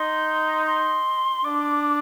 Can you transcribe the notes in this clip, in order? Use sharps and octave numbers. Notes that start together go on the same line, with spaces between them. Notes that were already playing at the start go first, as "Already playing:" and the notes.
Already playing: D#4 C6
C6
D4 D6